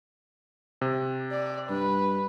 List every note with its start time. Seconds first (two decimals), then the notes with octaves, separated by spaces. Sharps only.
0.81 C3
1.31 D5
1.70 G2 B4